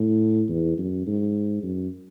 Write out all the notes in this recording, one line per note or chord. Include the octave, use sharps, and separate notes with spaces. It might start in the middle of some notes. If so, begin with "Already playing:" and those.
Already playing: A2
E2
F#2
G#2
F#2